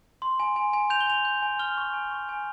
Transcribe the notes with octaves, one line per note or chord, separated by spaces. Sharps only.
C6
G#5
G#5
G#5
G6 F7
G7
G#5 F7
G6
G#5
F6 G7
C#6
G#5
C#6
G#5